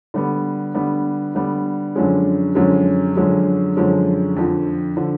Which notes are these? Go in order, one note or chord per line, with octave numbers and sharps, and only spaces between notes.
D3 G3 B3
D3 G3 B3
D3 G3 B3
F#2 D3 F3 G#3 C#4
F#2 D3 F3 G#3 C#4
F#2 D3 F3 G#3 C#4
F#2 D3 F3 G#3 C#4
F2 D3 F3
D3 F3